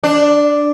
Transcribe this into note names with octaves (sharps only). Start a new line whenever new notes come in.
D4